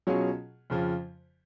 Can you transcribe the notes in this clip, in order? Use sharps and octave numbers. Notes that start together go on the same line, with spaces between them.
B2 F#3 C#4 F4 G#4
F2 C#3 F3